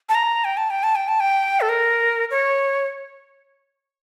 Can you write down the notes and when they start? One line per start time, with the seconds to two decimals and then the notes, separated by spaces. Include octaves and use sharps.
0.09 A5
0.15 A#5
0.44 G5
0.57 A5
0.70 G5
0.83 A5
0.95 G5
1.08 A5
1.20 G5
1.61 A4
1.69 A#4
2.31 C#5